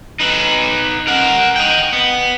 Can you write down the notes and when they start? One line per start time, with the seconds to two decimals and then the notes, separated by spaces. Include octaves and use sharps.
0.20 D#4 B4
1.07 A#4 F#5
1.56 D#5 G5
1.93 B3